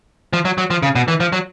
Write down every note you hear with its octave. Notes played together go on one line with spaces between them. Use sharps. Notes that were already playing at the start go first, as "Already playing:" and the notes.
F3
F#3
F#3
F3
C#3
B2
E3
F3
F#3